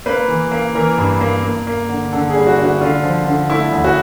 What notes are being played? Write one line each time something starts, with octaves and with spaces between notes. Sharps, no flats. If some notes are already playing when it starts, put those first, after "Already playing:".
A#3 B4
E3
A#3
E3 A#4
G2
A#3
A#3
A#3
D3
D3 A4
G#4
G3
F#4
D3
F#4
D3 F4
F3
D3
A3 E4
D2
F#4